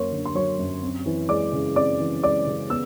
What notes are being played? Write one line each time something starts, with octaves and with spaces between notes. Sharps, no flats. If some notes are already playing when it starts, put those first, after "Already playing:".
Already playing: F#2 A#3 A#4 C#5 C6 C#6
D3
C6
F#3 C#5 C#6
F#2
C4
E3
G#3 D5 D6
C#3
C4 D5 D6
E3
G#3 D5 D6
C#3
B3 E6